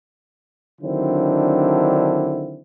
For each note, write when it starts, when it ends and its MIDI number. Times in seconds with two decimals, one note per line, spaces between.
0.81 2.62 50
0.81 2.62 51
0.81 2.62 54
0.81 2.62 60
0.81 2.62 62
0.81 2.62 64